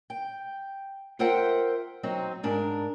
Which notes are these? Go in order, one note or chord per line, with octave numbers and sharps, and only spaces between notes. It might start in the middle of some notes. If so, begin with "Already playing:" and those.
G5
F4 A#4 C5 E5 F#5 G5
F#3 C4 D#4
G#2 D4 A#4